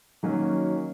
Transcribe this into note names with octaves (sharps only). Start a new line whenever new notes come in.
D#3 F#3 A#3 C#4 F#4